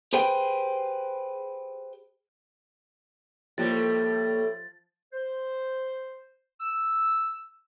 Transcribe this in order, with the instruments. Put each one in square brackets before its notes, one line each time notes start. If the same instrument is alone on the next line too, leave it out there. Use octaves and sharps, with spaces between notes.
[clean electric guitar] G4 G#4 B4 C5 G5
[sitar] A2 G3 [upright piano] F3 [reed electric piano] A#3 G4 [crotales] A6
[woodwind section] C5
E6